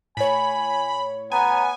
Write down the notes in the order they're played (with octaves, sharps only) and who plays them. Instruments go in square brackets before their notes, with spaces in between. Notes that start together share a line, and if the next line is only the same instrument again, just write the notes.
[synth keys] A2 C#5 [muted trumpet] G#5 [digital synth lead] B5
[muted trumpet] B3 [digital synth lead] G#5 [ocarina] A#5